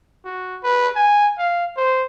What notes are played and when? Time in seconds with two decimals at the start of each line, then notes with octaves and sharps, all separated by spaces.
0.24 F#4
0.63 B4
0.95 G#5
1.38 F5
1.77 C5